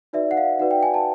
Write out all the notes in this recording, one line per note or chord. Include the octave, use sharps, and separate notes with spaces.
D#4 F#4 B4 D5 E5
F#5
F5
D#4 F#4 B4 D5 F#5
G5
G#5
A5